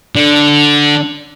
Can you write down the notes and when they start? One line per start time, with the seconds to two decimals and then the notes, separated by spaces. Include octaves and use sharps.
0.16 D3